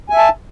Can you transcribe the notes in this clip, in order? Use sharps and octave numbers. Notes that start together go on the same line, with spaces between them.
E5 G#5 A5